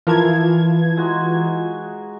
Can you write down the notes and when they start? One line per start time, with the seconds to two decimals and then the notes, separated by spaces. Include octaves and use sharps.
0.07 E3 F3 F4 A#4 A5 G#6
0.97 G#3 D#4 F#4